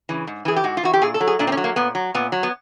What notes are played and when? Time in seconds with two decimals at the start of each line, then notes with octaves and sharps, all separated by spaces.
0.09 C#3 E3
0.27 G#2
0.45 E3 G#4
0.56 G4
0.64 G#2 F#4
0.77 F4
0.83 E3 F#4
0.93 G4
1.02 A#2 G#4
1.14 A4
1.21 F#3
1.27 G#4
1.39 A#2 D4
1.47 C4
1.52 C#4
1.57 F#3
1.64 A#3
1.76 A#2 B3
1.95 F#3
2.14 A#2 B3
2.32 F#3
2.43 B3